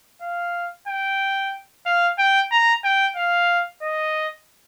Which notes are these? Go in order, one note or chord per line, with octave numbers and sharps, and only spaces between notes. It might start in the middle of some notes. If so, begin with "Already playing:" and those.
F5
G5
F5
G5
A#5
G5
F5
D#5